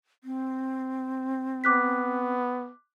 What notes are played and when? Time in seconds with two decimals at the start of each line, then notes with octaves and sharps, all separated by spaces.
0.24 C4
1.64 B3 D6 F#6 B6